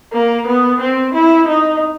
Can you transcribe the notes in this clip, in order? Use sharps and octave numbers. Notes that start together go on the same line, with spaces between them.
A#3
B3
C4
E4
D#4